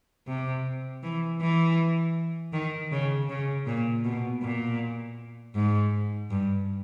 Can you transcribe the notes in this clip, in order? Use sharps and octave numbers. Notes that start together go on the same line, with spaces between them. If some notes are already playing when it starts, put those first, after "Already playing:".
C3
E3
E3
D#3
C#3
C#3
A#2
B2
A#2
G#2
G2